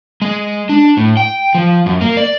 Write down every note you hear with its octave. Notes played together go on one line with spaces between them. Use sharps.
G#3
D4
A2
G5
F3
F#2
A#3
D5